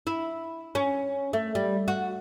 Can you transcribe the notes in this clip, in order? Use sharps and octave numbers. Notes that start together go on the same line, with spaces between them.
E4
C#4
A3
G3
F#4